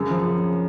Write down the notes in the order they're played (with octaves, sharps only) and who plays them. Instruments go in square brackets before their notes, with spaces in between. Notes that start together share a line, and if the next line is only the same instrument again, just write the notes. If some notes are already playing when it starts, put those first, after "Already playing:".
Already playing: [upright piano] F#2 C#3
F3
C#3